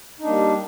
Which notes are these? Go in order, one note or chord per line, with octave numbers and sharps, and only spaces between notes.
G3 A#3 D4 D#4